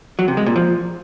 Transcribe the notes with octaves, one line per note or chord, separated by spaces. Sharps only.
F#3
C3
G#3
A#2
F3